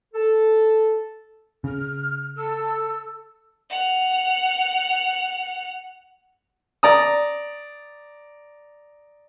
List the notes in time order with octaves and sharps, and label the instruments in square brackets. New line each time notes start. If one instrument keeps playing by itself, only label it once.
[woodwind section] A4
[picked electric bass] C#3 [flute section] F6
[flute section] A4 E6
[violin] F#5 F7
[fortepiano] D5 A#5 D#6